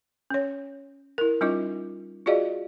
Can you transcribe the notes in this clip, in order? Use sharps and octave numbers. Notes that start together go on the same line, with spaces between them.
C#4 C#5
E4 A#4
G3 C#4 D#4 F4 D#5 D6
F4 F#4 G#4 D5 D#5 F5